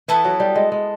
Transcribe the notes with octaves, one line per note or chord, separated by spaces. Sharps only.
E3 B3 E4 A4
F#3
G3
G#3
G#3